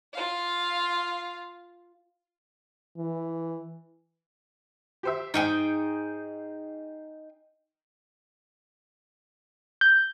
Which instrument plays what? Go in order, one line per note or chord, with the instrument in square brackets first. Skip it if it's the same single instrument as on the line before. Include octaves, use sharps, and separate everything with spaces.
[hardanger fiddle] F4 F5
[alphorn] E3
[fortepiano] G4 C5 E5
[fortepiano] G#2 [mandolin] D#4 G#4 G5
[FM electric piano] G6